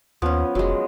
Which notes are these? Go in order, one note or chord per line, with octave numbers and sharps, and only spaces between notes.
D#2 F3 B3 C#4
F1 F#3 G#3